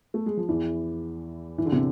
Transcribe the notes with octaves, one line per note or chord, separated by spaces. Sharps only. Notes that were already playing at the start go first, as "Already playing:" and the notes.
A3
G#3
F3
E2 E3
E3
D3
C3